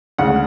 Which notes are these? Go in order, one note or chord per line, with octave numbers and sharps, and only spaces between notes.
D2 C#3 G#3 F#5